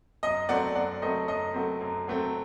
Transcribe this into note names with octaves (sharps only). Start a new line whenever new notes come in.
F#2 D#5
F#3 A3 C4 D5 F#5
F#2 D5 F#5
F#3 A3 C4 D#5
F#2 D#5
F#3 A3 C4
F#2
F#3 A3 C4